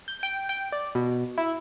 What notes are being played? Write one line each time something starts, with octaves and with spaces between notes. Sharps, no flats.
G6
G5
G5
D5
B2
E4